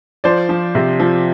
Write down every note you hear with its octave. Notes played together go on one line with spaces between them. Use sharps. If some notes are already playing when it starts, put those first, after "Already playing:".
F3 C5 D5
F3
C3
F3